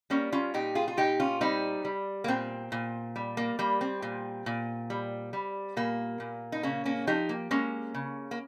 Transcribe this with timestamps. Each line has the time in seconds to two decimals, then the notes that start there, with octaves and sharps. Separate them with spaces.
0.10 G3 A#3 C#4
0.32 C#4 F4
0.54 A#2 D#4 G4
0.75 F4 G#4
0.88 F4
0.97 A#2 D#4 G4
1.20 C#4 F4
1.41 G3 C4 D#4
1.85 G3
2.24 A#3
2.28 A#2 C4
2.72 A#2
3.16 G3
3.37 A#3
3.59 G3 A#3
3.81 C4
4.02 A#2
4.46 A#2
4.90 G3
5.33 G3
5.77 A#2 A#3
6.20 A#2
6.52 D#4
6.63 C#3 A#3 C#4
6.85 A#3 C#4
7.07 F3 D#4 G4
7.29 A#3
7.51 G#3 A#3 C#4
7.94 C#3
8.31 A#3